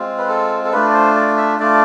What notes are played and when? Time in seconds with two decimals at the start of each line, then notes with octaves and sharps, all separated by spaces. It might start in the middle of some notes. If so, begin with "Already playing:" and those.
Already playing: G#3 C4 F4
0.18 B4
0.28 A4
0.65 A4
0.72 A3 D4 F4 B4
0.89 D5
0.94 C5
1.16 D5
1.37 E5
1.59 A3 D4 F4 D5